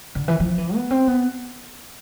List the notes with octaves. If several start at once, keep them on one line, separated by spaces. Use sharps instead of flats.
D3
E3
F3
E3
B3
C4
B3